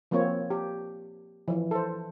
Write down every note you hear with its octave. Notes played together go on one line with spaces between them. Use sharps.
F3 A#3 C4 F4 C#5
G4
E3 F3
A4 C5